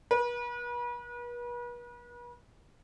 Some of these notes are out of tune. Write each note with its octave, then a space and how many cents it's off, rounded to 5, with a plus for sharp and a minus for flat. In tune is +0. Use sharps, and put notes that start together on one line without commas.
B4 -40